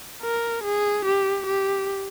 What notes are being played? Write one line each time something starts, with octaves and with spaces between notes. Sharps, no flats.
A#4
G#4
G4
G4